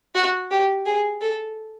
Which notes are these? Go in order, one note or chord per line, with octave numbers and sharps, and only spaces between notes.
F#4
G4
G#4
A4